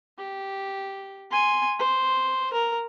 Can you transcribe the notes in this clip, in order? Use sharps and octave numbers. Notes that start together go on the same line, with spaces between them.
G4
G#5 C6
C5
A#4